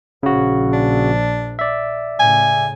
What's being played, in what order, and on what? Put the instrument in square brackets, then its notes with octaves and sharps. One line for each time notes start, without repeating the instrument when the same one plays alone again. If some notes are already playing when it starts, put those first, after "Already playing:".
[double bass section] A#1 [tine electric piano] C#3 F#4
[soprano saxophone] D4
[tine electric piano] D5 E5
[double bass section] A2 C#3 [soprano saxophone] G#5